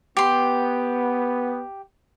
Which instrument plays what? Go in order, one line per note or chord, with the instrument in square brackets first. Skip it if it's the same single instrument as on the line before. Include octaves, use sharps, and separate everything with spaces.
[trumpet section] B3 [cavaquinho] G4 C6